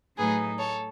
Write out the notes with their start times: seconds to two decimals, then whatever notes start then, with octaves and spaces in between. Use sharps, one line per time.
0.18 A2 F#3 A3 D#4 G#4 B4
0.59 A4 C#5